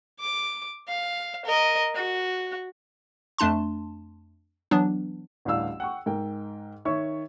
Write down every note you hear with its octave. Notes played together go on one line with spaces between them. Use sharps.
D6
F5
A#4 D#5
F#4
F2 A3 D4 A5 C6
E3 F#3 B3 D4
A1 D2 E3 G3 F5 E6
F#5 G5 C#6
G#2 A#4 G5
D#3 C#5 E5 C#6